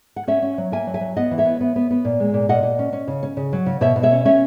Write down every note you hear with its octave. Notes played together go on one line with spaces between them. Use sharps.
F#5
C#4 C#5 E5
C#4
F#3
A#3 E5 G#5
F#3
E5 G#5
F#3
B3 D#5 F#5
E3
C#5 E5
B3
B3
B3
B3
A#2
G#3
A#2
A#2 D#5 F#5
A#2
C#4
C#4
C#3
C#4
C#3
F#3
C#3
B2 C#5 E5
B2
C#5 E5
C#4
C#4 C#5 E5